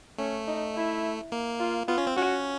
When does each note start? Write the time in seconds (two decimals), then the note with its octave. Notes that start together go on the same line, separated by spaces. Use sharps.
0.18 A3 C#4
0.48 D#4
0.75 E4
1.32 A#3
1.60 F4
1.88 B3 F4
1.98 C#4
2.07 C4
2.16 C#4 F#4